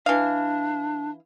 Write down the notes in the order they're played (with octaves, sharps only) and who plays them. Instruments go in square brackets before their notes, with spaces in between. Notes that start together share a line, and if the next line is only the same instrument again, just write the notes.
[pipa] E3 F5 [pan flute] D4